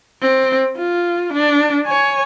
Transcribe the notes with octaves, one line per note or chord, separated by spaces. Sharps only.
C4
F4
D4
C#5 G#5